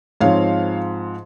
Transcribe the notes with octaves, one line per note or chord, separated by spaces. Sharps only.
G#2 F3 C4 C#5 F5